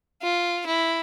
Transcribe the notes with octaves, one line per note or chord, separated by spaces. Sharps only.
F4
E4